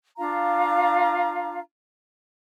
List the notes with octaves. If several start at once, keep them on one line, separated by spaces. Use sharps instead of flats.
D4 F4 F5 A#5